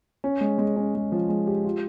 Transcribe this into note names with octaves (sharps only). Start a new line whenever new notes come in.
C#4
G#3
G#3
C#4
G#3
F3
G#3
G4
F4